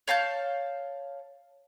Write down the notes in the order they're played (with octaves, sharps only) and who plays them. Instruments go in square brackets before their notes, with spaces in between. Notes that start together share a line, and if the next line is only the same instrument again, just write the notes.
[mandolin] C#5 F5 A5 G6